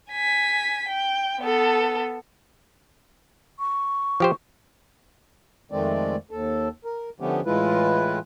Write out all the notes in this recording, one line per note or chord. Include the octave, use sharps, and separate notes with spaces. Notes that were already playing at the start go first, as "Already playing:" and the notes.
G#5 B6
G5
B3 A4
C#6
F3 G4 C5
F2 D#3 G#3 A3 C4 D5
D#2 A4
A#4
D3 F3 A3 B3 C#4 G4
A2 E3 G#3 E4 F4 B4